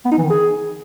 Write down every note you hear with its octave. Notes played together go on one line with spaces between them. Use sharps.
B3
D#4
E3
D#3
G#4